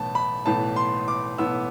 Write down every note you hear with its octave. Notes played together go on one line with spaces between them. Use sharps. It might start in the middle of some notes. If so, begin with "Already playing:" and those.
Already playing: B1 A2 E3 B3 A5
B5
B1 A2 E3 B3 A5
C6
D6
B1 A2 E3 B3 E6